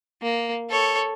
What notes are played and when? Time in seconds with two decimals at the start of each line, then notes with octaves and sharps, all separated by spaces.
0.22 A#3
0.70 A4 C#5